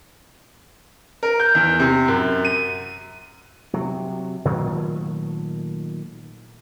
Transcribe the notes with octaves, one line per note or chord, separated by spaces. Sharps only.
A#4
G6
E2
C3
F#2
D#7
C3 F#3
A#2 D#3 F#3 A3